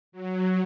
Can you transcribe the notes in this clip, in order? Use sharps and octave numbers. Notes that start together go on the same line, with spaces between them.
F#3